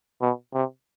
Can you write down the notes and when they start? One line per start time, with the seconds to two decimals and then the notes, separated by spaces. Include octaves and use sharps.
0.22 B2
0.54 C3